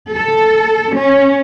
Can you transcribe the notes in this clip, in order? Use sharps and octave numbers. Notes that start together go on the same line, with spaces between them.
A4
C#4